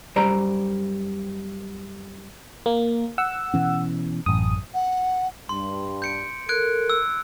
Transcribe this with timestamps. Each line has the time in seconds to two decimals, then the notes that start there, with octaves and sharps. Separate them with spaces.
0.16 F#2 G3 C5 D5 A#5
2.66 A#3
3.18 F#5 E6
3.54 B2 E3 C#4
4.26 A1 F#2 D#6
4.74 F#5
5.49 G2 C6
6.02 G6 C#7 D7
6.49 A4 A#4 F#6 G#6 D7
6.90 E6